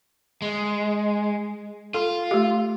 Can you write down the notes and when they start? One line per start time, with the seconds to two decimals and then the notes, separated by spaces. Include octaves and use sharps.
0.42 G#3
1.94 F4 A4
2.31 A3 G4